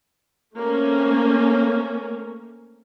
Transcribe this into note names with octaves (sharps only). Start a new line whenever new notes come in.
A3 A#3 C4 C#4